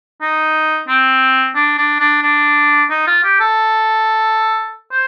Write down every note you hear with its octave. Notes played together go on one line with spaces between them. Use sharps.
D#4
C4
D4
D4
D4
D4
D#4
F4
G4
A4
C5